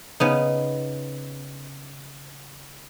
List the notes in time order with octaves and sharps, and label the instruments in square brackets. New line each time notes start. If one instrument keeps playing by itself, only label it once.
[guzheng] C#3 B3 D#4